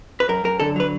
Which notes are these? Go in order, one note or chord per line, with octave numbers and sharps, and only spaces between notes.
B4
F#2 A#4
F#2 A#4
D3 A4
F#3 B4